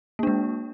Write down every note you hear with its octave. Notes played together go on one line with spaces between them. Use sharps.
G#3 A#3 D4